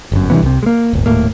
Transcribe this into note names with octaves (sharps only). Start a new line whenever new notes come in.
G1 F#2
G2 C3 E3 B3
C2 C3
G#3 A#3
D1 G1
D#1 A2 A#3